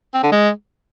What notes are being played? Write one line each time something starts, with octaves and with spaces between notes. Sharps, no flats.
C4
D3
G#3